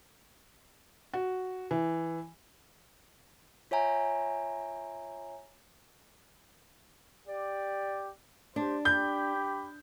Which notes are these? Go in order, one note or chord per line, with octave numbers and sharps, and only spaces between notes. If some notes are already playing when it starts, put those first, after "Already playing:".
F#4
E3
F4 C#5 E5 G#5 A#5
G4 D5
D4 G4 C5
G4 B5 G6